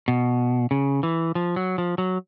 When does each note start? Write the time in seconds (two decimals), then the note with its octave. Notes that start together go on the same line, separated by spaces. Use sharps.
0.08 B2
0.71 C#3
1.03 E3
1.35 F3
1.56 F#3
1.78 F3
1.98 F#3